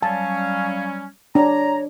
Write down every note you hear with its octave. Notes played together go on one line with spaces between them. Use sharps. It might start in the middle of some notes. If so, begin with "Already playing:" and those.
F#3 G3 C#4 F5 A5
D4 C#5 A#5